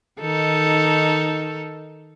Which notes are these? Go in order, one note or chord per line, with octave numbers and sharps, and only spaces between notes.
D#3 D#4 A4